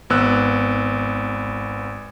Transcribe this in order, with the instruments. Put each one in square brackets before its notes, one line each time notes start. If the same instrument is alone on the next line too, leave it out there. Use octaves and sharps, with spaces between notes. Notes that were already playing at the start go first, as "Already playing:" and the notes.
[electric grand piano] G#1 B3 E6 F#6